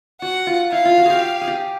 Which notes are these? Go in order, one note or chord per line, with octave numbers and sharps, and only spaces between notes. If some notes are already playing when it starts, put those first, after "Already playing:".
F#4 F#5
F4
E4 F5
F4
F#4
G4 G#4
G#4
G4